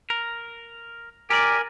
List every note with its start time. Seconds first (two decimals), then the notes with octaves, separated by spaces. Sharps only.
0.10 A#4
1.30 G4 A#4 D5 G#5